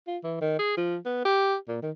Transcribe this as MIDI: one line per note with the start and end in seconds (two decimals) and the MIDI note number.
0.07 0.17 65
0.23 0.41 52
0.41 0.59 51
0.59 0.76 68
0.77 0.96 53
1.06 1.22 59
1.25 1.56 67
1.68 1.77 46
1.82 1.91 51